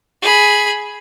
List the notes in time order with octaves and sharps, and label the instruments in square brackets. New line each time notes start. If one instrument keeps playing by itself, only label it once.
[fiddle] G#4 B5